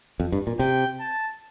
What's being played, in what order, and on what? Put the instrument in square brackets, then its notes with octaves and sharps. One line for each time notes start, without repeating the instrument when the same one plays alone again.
[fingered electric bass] F2
G2
A#2
[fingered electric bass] C3 [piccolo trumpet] G5
[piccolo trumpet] A5